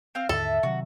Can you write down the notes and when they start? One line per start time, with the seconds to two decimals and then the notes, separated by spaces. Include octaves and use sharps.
0.15 C4 F5 F6
0.29 D#2 G#2 D3 A4 E5
0.63 C3 D#3 F#3 F#4